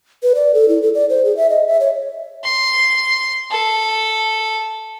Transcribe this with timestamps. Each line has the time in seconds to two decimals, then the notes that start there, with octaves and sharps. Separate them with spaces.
0.23 B4
0.35 D5
0.54 A4
0.69 E4
0.82 A4
0.94 D5
1.10 C5
1.25 G#4
1.37 E5
1.50 D#5
1.67 E5
1.80 C#5
2.44 C6
3.51 A4